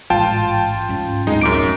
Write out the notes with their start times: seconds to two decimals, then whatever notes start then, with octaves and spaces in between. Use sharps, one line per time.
0.10 A1 G#2 F4 G5 A5
0.89 G#2 C#4
1.27 D1 G#3 D#4
1.41 F#2 D6 D7